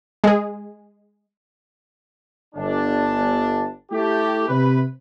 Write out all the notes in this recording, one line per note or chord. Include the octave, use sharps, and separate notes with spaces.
G#3 G#4
G1 D4
A3 E4 G4
C3 B4